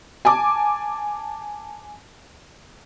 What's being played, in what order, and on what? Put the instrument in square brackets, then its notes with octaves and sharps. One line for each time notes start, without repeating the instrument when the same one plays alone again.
[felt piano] G#5 A5 D6